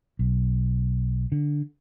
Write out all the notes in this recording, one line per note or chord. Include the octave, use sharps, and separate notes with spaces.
B1
D3